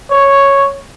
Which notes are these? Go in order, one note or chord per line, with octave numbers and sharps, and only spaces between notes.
C#5